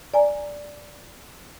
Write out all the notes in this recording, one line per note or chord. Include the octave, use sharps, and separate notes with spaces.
D5 G#5 A#5